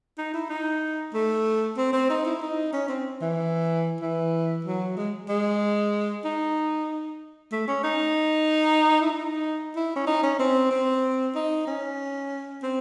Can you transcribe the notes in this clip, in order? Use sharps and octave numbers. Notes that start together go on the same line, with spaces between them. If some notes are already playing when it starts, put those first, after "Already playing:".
D#4
E4
D#4
A3
C4
C4
D#4
E4
D#4
C#4
C4
E3
E3
F#3
G#3
G#3
D#4
A3
C#4
D#4
E4
D#4
E4
C#4
D#4
C#4
C4
C4
D#4
C#4
C4